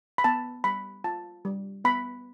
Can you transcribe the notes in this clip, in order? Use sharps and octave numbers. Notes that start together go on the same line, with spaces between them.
B5
B3 A5
G3 B5
F4 A5
G3
B3 B5